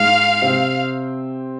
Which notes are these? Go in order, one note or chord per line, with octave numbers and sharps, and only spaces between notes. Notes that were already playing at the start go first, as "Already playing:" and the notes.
Already playing: G#2 G#3 F5
C3 C4